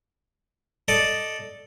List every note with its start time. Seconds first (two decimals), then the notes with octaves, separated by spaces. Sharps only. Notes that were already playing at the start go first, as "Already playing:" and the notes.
0.88 A4 D5 D#5